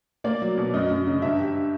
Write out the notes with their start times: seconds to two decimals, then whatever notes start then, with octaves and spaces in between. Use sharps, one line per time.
0.24 A#3 D5
0.42 F#3
0.58 B2
0.73 F#2 D#5
0.91 F#2
1.07 C#3
1.22 G2 E5
1.39 G3